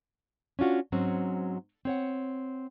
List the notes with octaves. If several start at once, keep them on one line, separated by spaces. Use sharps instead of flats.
C#4 D4 F4 F#4
G#2 F#3 C4 C#4 F#4
C4 C#5 F#5